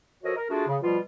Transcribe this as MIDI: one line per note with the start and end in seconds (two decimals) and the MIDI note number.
0.23 0.36 53
0.23 0.36 66
0.23 0.36 69
0.23 0.36 70
0.23 0.36 73
0.23 0.36 75
0.37 0.46 70
0.50 0.65 57
0.50 0.65 62
0.50 0.65 65
0.50 0.65 66
0.50 0.65 68
0.68 0.77 49
0.82 0.99 47
0.82 0.99 53
0.82 0.99 55
0.82 0.99 65